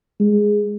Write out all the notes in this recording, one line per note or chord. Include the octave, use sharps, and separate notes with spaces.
G#3